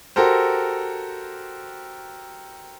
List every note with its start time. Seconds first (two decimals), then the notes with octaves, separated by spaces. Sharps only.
0.16 F#4 G4 A4 A#4 C5